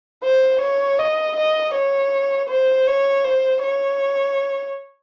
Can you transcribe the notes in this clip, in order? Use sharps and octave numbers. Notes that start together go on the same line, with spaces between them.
C5
C#5
D#5
D#5
C#5
C5
C#5
C5
C#5